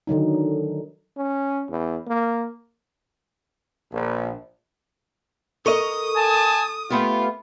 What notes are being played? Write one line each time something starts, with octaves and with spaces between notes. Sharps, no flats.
D3 D#3 F#3 D#4
C#4
E2
A#3
A#1
A4 A#4 D#5 C#6 D#6 D#7
G#5 A5
A3 B3 F4 G4